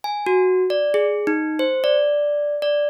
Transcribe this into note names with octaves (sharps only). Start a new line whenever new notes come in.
G#5
F#4
D5
G#4
D#4
C5
D5
D5